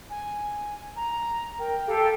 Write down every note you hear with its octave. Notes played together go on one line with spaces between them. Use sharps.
G#5
A#5
A#4 G5
G4 A4 F5